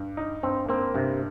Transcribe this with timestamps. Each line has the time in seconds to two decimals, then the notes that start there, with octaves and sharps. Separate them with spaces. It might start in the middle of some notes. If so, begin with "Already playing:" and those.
Already playing: G2
0.17 D#4
0.43 G2 C4
0.69 A#3 C4
0.94 G2 C3